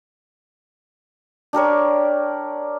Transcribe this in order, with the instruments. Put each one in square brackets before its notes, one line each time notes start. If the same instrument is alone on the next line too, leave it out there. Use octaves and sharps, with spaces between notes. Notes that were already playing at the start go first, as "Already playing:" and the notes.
[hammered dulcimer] D4 G4 A#4 C#5